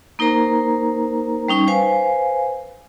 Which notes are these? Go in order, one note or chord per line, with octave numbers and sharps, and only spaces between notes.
A#3 D#4 A#4 C5 A#5
G3 C#4 D#4 C#6
B4 C5 F5 G#5